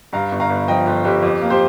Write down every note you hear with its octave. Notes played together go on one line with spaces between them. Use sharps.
G2 F5 A#5
G1
F5 A#5
G1
F3 D#5 G5
G1 F4
G1 G4
F2 G4
A#3
G4 C5